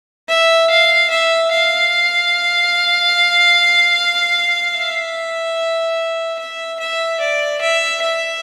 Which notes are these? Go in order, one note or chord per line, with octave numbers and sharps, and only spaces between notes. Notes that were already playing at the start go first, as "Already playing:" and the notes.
E5
F5
E5
F5
E5
E5
E5
D5
E5
E5